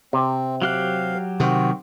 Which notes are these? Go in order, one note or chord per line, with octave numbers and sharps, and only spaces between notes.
C3 C4
F#3 G4 F5 F#6
C3 D#3 C4 F#4